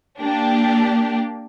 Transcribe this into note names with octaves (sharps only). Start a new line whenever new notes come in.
A#3 D4 G4